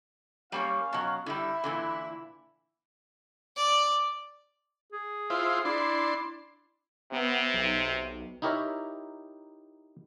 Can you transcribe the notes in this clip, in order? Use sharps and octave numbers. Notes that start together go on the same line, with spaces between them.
G3 A#3 C#4 C#5 F5
B2 F#3
D3 G3 E4
A#2 D3 E3
D5
G#4
E4 F4 C5
D4 E4 C6
C3 B3
B1
D#4 E4 G4 A#4 C#5 E5